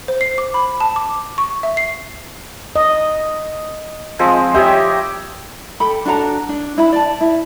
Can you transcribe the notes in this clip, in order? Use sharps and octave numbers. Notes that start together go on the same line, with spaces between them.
C5
C7
D6
B5
A5
D6
C#6
E5
C7
D#5
F3 G#3 C4
G4 C#5 D#5 E5 G5
G4 A4 B5
D4 F#4 A4 A#5
D4
D4 E4 D#5 B5
D5 A5
E4